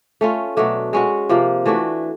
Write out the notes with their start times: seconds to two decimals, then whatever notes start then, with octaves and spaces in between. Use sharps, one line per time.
0.21 A3 C#4 F4
0.57 B2 F#3 A3 D4
0.93 G#3 C#4 F#4
1.29 C3 F3 A#3
1.66 E3 A3 D4 F#4